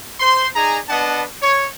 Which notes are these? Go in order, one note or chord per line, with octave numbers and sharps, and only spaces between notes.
C5 C6
D#4 G#4 D5 G#5 A#5
B3 D4 B4 D#5 F#5 A5
C#5